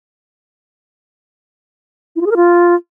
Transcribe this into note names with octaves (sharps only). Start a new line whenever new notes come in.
E4
F4
G#4
A#4
F4